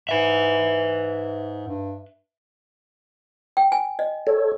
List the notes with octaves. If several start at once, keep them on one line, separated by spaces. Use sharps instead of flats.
G#2 B4 E5
G2
G5
G#5
D#5
A4 C#5